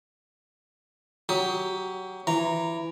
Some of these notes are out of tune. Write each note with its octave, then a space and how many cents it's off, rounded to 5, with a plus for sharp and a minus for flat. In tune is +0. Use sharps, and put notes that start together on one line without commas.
F#3 +20 G4 +10 D#6 +20
E3 +15 A#5 -5